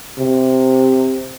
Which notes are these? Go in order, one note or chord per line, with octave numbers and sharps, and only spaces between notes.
C3